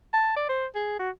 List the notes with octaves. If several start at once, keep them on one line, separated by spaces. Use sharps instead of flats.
A5
D5
C5
G#4
F#4